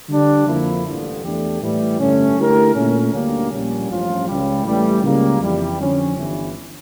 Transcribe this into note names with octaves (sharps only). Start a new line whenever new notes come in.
D3 G3 D4
F2 D3 F3 A#3 E4
A1 G2 D3 F3
E2 E3 A3 D4 G4
A2 E3 G3
G2 D3 A3 C#4
D3 A3 E4 G4 A#4
A#2 A3 C#4
D2 D3 G3 A#3
A#1 A#2 G3 A#3 C#4
A1 G2 F3 C#4 F4
C#2 C#3 G3
A1 A2 E3 G3
C#2 C#3 G3 A#3
F2 E3 G3
F2 D3 F3 C#4
G1 G2 E3